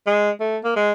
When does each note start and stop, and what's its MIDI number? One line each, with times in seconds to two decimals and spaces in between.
0.06 0.31 56
0.40 0.57 57
0.64 0.74 58
0.76 0.93 56